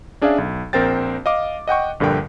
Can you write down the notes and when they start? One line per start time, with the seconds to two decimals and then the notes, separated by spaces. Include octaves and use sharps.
0.21 C#4 D4 G#4 D5 E5 F5
0.38 B1
0.73 A#1 C4 A#4 C5 G5 A6
1.26 D#5 F5 D6
1.68 D#5 F#5 G5 C#6
2.00 A#1 G2 D3 A#4 G5